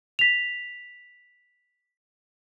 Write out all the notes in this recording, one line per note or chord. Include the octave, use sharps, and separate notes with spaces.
B6 F7